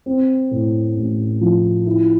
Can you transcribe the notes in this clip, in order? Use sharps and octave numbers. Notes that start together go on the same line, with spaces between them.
C4
A2
A1
F3
E4